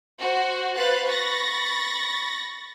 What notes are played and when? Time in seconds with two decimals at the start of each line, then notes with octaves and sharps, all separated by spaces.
0.19 F#4 C5
0.75 B4 C5 F5 F#6 A6
1.07 B5 C#6 A6 A#6